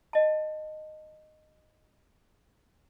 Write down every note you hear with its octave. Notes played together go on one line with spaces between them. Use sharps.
D#5 A5